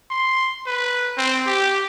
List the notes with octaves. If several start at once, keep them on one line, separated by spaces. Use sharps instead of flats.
C6
B4
C4
G4